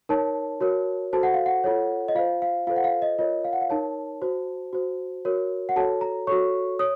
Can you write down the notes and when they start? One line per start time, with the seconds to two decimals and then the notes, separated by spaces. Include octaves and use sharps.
0.09 D#4 A#4 C#5 A5
0.61 F#4 A#4 C#5
1.13 F#4 A4 C5 A5
1.23 F#5
1.34 F5
1.46 F#5
1.64 F4 A4 C#5
2.08 D#5
2.15 F4 C5 F5
2.42 F5
2.67 F4 A4 C5 F5
2.76 F#5
2.84 F5
3.02 D#5
3.19 F4 A#4 C#5 D#5
3.44 F5
3.53 F#5
3.61 F5
3.69 D#4 A#4 C#5 A5
4.22 F#4 C5
4.73 F#4 C5
5.25 F#4 A#4 C#5
5.69 F#5
5.76 F#4 A4 C#5 A5
6.01 A#5
6.27 F#4 A4 C#5 C#6
6.79 C#5 D#6